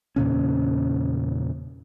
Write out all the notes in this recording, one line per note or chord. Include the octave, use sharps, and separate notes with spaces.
E2 A#2 C#3 C#4